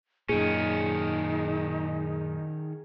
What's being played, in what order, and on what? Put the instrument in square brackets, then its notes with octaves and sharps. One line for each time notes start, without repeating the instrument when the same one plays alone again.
[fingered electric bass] F#2 A#2 [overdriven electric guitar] D#3 C#4 [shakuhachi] D#4 [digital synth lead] G#4